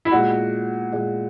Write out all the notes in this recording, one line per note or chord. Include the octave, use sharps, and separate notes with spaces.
E4
A#2 G#3 F#4
A#2 G#3